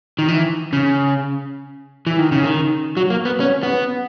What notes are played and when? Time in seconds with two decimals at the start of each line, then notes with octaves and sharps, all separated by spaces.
0.19 D#3
0.28 E3
0.73 C#3
2.07 E3
2.19 D#3
2.32 C#3
2.44 D#3
2.97 F#3
3.10 A#3
3.25 B3
3.40 C#4
3.63 B3